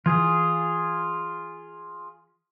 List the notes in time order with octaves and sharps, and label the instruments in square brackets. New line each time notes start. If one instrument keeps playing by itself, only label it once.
[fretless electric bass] E3 [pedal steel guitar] F4 G#4